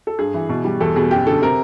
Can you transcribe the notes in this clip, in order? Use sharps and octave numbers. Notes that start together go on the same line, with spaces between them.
A4
G2 G#4
E3
B2
G3
E2 A4
B2 G#4
F#2 G4
D3 A4
C3 A#4